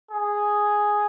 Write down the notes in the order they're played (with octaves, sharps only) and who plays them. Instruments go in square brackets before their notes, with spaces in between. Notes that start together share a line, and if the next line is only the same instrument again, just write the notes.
[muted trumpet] G#4